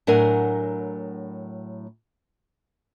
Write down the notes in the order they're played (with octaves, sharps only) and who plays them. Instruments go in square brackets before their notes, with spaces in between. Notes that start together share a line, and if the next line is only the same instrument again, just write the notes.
[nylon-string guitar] A2 F#3 D4 A#4 F#5 G#5